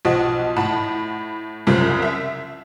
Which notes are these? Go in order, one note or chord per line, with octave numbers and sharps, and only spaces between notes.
B1 F3 D#5 F#5 A5
A2 F#5 A5 B5
C2 F#2 C#3 F3
E5